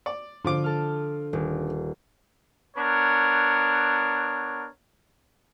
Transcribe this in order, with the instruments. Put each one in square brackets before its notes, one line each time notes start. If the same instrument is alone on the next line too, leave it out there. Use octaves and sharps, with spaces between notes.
[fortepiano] D5
[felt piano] D3 [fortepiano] F3 F4 D6
[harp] A4 F6
D#1
[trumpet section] B3 D4 A#4 C#5